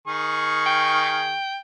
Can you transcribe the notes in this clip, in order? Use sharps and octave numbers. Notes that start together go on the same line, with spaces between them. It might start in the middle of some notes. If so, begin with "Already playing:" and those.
D#3 G#4 C#6
G5